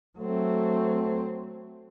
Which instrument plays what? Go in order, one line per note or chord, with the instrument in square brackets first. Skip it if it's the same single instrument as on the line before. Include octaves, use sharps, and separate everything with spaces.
[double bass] F#3 C4 [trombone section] A3